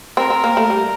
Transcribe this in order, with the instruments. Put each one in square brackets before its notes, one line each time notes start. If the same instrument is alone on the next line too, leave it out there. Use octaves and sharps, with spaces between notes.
[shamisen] C4 [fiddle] A#4
[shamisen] C4
A#3
A3
G3